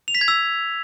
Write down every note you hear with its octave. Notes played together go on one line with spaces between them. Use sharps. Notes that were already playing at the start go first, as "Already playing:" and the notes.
F7
B6
G#6
E6